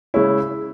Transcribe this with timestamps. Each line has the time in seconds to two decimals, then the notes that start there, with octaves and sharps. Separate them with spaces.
0.14 C#3 G#3 C#4 E4